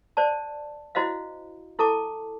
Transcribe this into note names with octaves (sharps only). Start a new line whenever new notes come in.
C5 D5 A5
E4 F#4 C5 D#5 F5
E4 A4 A5 D6